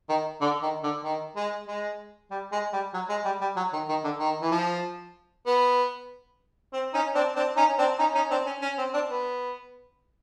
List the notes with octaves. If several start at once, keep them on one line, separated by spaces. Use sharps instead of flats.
D#3
D3
D#3
D3
D#3
G#3
G#3
G3
G#3
G3
F#3
G#3
G3
G3
F#3
D#3
D#3
D3
D#3
E3
F3
B3
C4
C#4 D#4
C4 D4
C4 D4
C#4 D#4
C4 D4
C#4 D#4
C#4 D#4
C4 D4
C#4
C#4
C4
C4 D4
B3